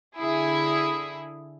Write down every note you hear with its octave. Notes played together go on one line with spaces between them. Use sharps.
D3 E4 G#4